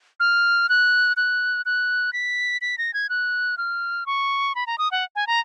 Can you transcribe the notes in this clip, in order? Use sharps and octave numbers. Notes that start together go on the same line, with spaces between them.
F6
F#6
F#6
F#6
B6
B6
A#6
G#6
F#6
F6
C#6
B5
A#5
D#6
F#5
G#5
A#5